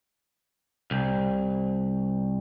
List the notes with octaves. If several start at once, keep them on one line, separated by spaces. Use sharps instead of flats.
C2